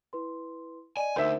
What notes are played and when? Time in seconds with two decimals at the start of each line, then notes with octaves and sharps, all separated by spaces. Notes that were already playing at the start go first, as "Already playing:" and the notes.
0.13 E4 B4 C6
0.97 D5 D#5 G#5
1.16 D2 D#4 A#4 C5 E5